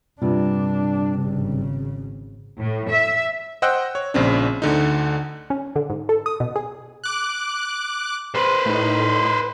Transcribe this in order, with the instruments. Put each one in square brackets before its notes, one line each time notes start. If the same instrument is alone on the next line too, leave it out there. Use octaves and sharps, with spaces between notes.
[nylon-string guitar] G2 C3 F4 [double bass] D4
[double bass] G#1 C#3
[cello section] A2
E5
[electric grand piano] C5 D#5 F#5 G5 E6 F#6
C#5
A#1 C#3 C4 D4
D2 D3 D#4
[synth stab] C#4
D3
G#2
A4
D#6
B2
G#4
[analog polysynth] D6 F#6
[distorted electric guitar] B4 C5
[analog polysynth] A2 D#4